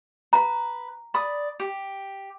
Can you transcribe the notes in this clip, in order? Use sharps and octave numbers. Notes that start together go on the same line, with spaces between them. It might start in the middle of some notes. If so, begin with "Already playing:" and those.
B4 A#5 B5
D5 B5 D#6
G4